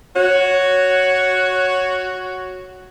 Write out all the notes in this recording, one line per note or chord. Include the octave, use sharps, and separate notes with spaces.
F#4 C#5